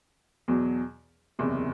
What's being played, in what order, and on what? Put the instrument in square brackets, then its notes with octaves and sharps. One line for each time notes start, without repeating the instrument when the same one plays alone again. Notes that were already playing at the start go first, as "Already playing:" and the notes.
[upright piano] E2 B2 F#3
F#1 E2 C3